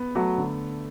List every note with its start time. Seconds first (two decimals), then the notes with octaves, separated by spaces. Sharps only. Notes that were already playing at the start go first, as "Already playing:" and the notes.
Already playing: B3
0.15 F#3 A3
0.38 D3